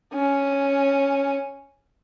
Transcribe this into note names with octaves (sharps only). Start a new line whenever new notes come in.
C#4